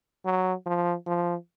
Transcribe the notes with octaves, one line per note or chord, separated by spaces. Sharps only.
F#3
F3
F3